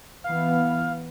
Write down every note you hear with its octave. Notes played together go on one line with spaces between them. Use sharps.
E3 B3 F5